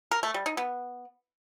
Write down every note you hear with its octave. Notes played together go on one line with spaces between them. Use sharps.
A#4
A3
G3
D#4
B3